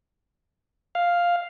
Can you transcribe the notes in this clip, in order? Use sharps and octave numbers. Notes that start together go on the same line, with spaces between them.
F5